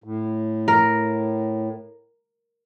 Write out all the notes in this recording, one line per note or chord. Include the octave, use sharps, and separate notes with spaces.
A2
A#4